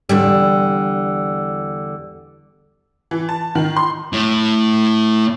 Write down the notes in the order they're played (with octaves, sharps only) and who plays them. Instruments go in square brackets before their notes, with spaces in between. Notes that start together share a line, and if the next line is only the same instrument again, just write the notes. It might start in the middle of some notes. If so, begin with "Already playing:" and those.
[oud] E2 D3 G3
[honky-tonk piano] E3
A5
D#3
C6
[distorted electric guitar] A2